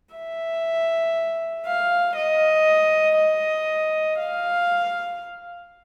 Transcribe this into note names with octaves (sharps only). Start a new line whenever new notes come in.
E5
F5
D#5
D#5
F5